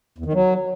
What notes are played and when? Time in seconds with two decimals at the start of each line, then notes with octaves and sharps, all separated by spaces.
0.18 E2
0.26 D#3
0.33 F#3